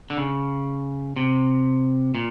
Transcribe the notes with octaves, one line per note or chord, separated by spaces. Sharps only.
D3
C#3
C3
A#2